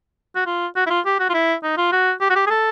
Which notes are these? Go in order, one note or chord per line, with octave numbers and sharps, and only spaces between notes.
F#4
F4
F#4
E4
F4
G4
F#4
F4
E4
D#4
F4
F#4
G4
F#4
G4
G#4
A4